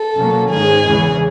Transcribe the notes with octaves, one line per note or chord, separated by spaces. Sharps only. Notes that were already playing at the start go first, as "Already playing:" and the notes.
Already playing: A4
B2 F#3 A#3 C#4
G#2 D#3 G#3 G#4
E2 C#3 E3 G#3 C#4